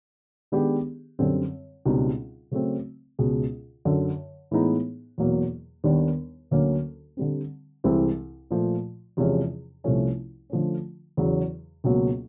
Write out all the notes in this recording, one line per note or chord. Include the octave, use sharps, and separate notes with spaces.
D#3 G#3 B3 D4 G4
F#2 D3 G3 C4
C#2 B2 G3 C4 D#4
C#3 F#3 A3 C4
C#2 B2 G#3
F#2 D3 F#3
A2 E3 G#3 B3 D#4
E2 B2 F#3 A#3
D#2 D#3 G3 B3 D4
D2 D3 F#3 A#3 C#4
D3 G3 C4
C2 C3 E3 G#3 C4
A#2 F3 A3
E2 C3 F3 G#3 C#4
C2 C3 F3 A3 C#4
D3 F3 A3 C#4
E2 C#3 F#3
C#2 B2 F#3 A#3